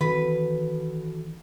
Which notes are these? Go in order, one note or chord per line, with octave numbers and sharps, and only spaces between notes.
D#3 E3 C4 F#4 A4 B4